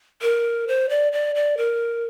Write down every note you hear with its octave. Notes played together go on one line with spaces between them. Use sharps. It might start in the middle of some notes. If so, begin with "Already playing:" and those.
A#4
C5
D5
D5
D5
A#4